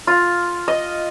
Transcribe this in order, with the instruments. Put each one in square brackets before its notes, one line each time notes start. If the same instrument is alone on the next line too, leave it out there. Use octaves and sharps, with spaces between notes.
[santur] F4
D#5